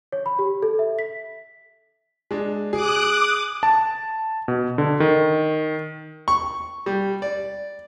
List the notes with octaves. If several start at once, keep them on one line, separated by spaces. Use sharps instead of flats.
C#5
B5
G4
A4
E5
B6
G#3 D4
G#4 D6 D#6 F#6
A5
B2
D3
D#3
C#6
G3
D5